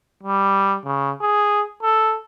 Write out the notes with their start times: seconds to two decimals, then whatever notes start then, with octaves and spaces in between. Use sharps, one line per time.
0.23 G3
0.85 C#3
1.22 G#4
1.83 A4